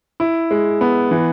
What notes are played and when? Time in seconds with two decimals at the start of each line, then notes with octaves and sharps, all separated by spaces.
0.20 E4
0.51 G#3
0.81 B3
1.11 E3